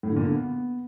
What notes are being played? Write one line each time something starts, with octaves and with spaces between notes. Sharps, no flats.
A2
D3
A#2
D3
B3